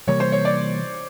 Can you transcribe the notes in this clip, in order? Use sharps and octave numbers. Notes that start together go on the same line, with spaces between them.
C3 E3 G3 A#3 C#5
C5
C#5
D5